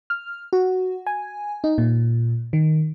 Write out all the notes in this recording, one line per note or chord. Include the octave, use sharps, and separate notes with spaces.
F6
F#4
G#5
D#4
A#2
D#3